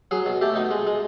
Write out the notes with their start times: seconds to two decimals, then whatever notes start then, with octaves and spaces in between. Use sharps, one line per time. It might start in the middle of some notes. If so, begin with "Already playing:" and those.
0.11 F#3 G#4
0.26 B2
0.41 A3 G4
0.56 B2 D#4
0.71 G#3
0.87 G#3